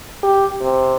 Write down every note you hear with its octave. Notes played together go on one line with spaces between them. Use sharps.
G4
C3